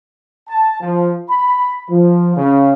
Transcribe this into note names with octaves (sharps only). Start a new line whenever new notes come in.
A5
F3
B5
F3
C#3